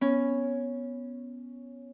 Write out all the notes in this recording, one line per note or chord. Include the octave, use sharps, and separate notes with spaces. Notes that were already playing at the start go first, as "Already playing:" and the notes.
B3 C#4